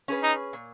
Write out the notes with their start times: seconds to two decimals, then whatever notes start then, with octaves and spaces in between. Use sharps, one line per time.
0.08 C#4 G#4 B4
0.23 D#4
0.53 A#2